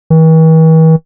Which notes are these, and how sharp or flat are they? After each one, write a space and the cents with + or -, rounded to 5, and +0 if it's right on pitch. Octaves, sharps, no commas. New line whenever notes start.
E3 -45